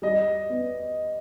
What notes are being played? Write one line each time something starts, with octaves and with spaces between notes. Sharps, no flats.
G3 D#5
B3